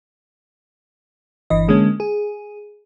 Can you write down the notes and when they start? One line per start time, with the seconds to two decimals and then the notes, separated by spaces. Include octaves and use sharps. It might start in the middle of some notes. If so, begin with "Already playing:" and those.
1.50 G1 E3 D#5
1.68 D3 G#3 A#3 C#4
2.00 G#4